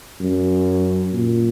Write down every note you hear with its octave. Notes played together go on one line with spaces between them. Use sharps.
F#2
A#2